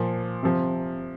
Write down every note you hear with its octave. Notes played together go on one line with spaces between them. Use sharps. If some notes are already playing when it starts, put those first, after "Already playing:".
Already playing: A#2 F3
C3 F3